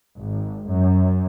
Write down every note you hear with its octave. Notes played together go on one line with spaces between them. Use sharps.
G#1
F#2